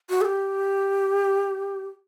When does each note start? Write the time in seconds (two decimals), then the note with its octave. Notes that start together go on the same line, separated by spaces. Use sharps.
0.10 F#4
0.21 A4
0.25 G4